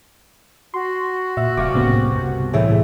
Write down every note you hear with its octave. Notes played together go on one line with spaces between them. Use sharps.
F#4 C6
A#2 E5
D#1 C2 F5 C#6 D6
A2 C#3 A#3 B3
G2
A2 E3 A3 G#4 C#5 E5